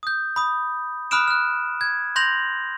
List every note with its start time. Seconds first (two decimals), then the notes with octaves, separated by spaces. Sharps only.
0.03 D#6 G6
0.36 B5 D#6
1.11 B5 D#6 F6 F#6 D7 E7
1.28 F6 F#6
1.81 G#6
2.16 C6 G6 A#6 F7 F#7